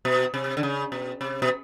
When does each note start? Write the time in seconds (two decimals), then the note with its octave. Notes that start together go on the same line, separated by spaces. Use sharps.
0.05 B2
0.34 C3
0.57 D3
0.63 C#3
0.92 B2
1.21 C3
1.42 B2